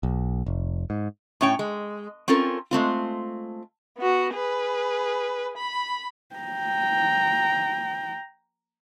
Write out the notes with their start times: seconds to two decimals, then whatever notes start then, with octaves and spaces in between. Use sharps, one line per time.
0.03 B1
0.46 F1
0.90 G#2
1.41 A2 C#4 C#5 G5
1.59 G#3
2.28 C4 C#4 F4 A4 A#4
2.71 G#3 A3 C4 F4
3.97 B3 F#4
4.34 G#4 B4
5.57 B5
6.36 G5 A#5